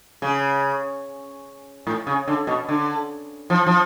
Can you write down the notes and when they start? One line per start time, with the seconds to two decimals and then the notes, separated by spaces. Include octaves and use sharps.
0.22 C#3
1.87 A2
2.07 C#3
2.27 D3
2.47 B2
2.69 D3
3.50 F3
3.67 F3